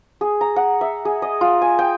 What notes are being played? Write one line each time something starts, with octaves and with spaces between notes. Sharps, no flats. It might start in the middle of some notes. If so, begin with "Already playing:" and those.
G#4
A#5
F#5
E5
G#4
D#5
F4
G#5
G5